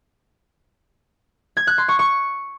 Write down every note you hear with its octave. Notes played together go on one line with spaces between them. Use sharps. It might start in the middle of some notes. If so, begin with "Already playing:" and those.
G#6
F#6
C6
C#6
C#6